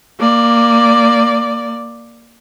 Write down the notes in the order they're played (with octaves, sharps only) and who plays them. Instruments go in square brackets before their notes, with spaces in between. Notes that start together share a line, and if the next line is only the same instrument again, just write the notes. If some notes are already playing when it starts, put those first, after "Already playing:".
[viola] A#3 D5